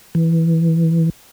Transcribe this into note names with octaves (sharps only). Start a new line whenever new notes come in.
E3